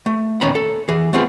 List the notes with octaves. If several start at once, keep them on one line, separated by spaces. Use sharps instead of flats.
A3
E2 A#2 D#3 C#4 A#5 B5
A4
E3 G#4
A3 B3 C4 F4 G#4